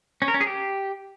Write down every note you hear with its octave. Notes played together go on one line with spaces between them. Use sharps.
C#4
A#4
C#4
G#4
G4